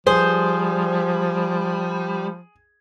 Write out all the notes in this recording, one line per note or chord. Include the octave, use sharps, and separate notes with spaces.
F3 G3 G#4 C5